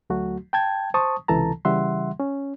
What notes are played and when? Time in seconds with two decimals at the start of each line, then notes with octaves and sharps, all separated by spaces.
0.10 D2 F#3 A3 F#4
0.53 G5 A5 G#6
0.94 C5 A5 C#6 D#6
1.28 C#2 C3 E3 A4 A5 A#5
1.65 C#3 E3 G3 E5 F#5 C6
2.20 C#4